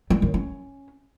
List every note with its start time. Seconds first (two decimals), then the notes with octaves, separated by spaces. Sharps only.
0.10 G3
0.22 D#3
0.34 C#4